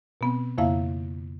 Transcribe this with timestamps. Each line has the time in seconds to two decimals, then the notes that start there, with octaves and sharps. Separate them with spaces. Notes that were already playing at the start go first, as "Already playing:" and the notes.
0.21 B2 B3 C4
0.58 F2 C#3 A#3 E4 E5 F5